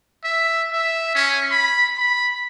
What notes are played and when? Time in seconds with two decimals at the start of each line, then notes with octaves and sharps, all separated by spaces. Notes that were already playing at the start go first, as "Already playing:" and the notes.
0.24 E5
0.72 E5
1.15 C#4
1.51 B5
1.98 B5